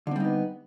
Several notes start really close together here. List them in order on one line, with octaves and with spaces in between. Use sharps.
D3 C4 G3 D#4 B3